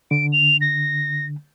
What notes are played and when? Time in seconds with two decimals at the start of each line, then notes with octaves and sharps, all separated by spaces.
0.11 D3 D7
0.33 F7
0.61 A#6